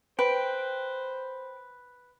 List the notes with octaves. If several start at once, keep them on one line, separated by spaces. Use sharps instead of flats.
B4 C5 G5